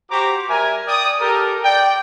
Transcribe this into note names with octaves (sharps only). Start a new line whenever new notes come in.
F#4 G4 C5 A#5 D6
G3 A#4 E5 G#5
D5 G5 D#6
G4 A4 A#4
D5 G5